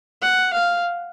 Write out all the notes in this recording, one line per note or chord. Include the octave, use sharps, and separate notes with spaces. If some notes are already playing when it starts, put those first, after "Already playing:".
F#5
F5